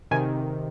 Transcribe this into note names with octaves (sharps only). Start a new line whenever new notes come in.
C3 D#3 G#5